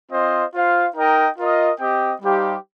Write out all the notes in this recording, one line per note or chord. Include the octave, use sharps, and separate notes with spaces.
C4 F4 C5 D#5
F4 C5 F5
D#4 A#4 D#5 G5
F4 A#4 D#5
C4 G4 D#5 G5
G3 D#4 G4 C5 F5